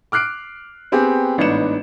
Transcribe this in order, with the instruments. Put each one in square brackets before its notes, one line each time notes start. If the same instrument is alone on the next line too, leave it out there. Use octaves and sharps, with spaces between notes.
[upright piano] D6 F6 F#6 C7 D7
B3 C4 G4 G#4
A1 G#2 B3 D4 C#7 E7